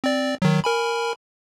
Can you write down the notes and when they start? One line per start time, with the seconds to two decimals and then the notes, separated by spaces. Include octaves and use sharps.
0.04 C4 D5
0.42 D#3 F#3
0.64 A#4 G#5 B5